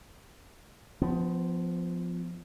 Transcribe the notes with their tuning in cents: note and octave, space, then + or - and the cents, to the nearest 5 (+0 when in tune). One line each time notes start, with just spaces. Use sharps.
F3 +0 B3 +30